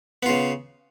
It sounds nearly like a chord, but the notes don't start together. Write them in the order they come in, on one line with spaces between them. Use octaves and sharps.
B3 F4 C#3